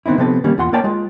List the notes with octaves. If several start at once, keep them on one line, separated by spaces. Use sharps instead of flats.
D#3 B3 C4 D#4 E4
C3 F3 B3 C4 A4 B4
D#3 G3 A#3 C#4
E2 F4 F#5 C6
A#3 A#4 C#5 D5 G5 A5
G#3 F4